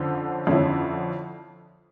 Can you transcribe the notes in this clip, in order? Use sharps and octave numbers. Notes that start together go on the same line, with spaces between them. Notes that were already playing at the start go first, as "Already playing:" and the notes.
Already playing: F2 D3 F3 C#4
F2 D3 F3 C#4 E4